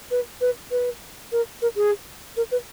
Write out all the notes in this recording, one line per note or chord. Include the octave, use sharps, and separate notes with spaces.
B4
B4
B4
A#4
A#4
G#4
A#4
B4